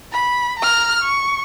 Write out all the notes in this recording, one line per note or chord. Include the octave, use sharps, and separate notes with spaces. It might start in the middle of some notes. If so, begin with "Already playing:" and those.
B5
A#5 F6
C#6